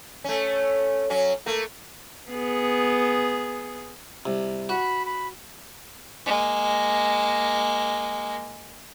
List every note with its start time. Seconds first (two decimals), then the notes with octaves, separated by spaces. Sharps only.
0.24 A3 C#4
1.10 F#3 C#4
1.46 A3 A#3
2.30 B3 G#4
4.26 C2
4.69 F#4 B5
5.06 B5
6.26 G#3 A#3